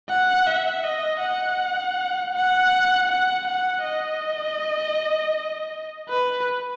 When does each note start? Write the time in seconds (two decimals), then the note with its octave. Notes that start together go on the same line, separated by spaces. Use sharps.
0.10 F#5
0.47 E5
0.84 D#5
1.21 F#5
2.34 F#5
3.09 F#5
3.47 F#5
3.84 D#5
6.09 B4